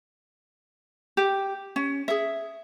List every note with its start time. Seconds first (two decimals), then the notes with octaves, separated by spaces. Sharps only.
1.17 G4
1.76 C#4
2.08 G#4 E5